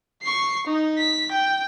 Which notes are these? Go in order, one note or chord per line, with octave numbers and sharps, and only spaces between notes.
C#6 C7
D#4
B6
G5